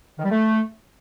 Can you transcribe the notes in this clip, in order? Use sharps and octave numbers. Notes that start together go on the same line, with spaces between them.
D#3
G3
A3